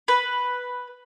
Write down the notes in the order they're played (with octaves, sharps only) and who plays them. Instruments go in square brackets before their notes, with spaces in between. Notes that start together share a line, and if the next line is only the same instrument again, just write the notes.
[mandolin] B4